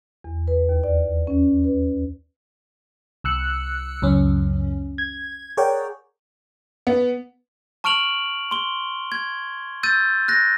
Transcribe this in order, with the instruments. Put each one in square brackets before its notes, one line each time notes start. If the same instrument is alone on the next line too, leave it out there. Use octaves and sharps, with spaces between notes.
[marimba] E2
B4
D#2
D5
C#4
B4
[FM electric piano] C2 E6 F#6 C#7
C#2 F#2 C#4
G#6
G#4 A#4 C#5 D5 F#5 G5
[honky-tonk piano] B3
[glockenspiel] A5 C#6 F6 D7 F7 F#7
C6 G7
G#6
E6 G6 A6 D#7
F#6 A#6